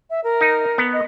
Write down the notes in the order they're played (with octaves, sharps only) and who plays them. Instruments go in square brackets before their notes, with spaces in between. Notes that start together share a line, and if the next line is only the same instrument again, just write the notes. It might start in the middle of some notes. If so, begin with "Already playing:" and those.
[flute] E5
A#4
[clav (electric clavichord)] D#4
B3
[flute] D#5